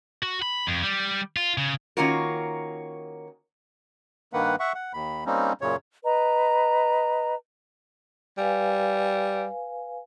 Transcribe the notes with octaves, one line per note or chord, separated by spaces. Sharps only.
F#4
B5
F2
G3
F4
C#3
D#3 A#3 C#4 F4 F#4 A#4
G2 D#3 A#3 B4 F#5
E5 F#5 C#6
F#5
D#2 B5
G3 A#3 C4 C#4 D#4
F#2 A#2 C#3 C#5
B4 D#5 A#5
G3 B4 F5 G#5